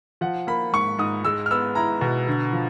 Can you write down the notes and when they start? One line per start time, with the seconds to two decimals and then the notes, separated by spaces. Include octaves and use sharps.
0.21 F3 F#5
0.47 A#3 B5
0.72 G#2 C#6
0.99 G#2 D#6
1.25 G#3 E6
1.46 F6
1.51 B3 E6
1.75 E4 A#5
2.01 B2
2.27 D3
2.52 F3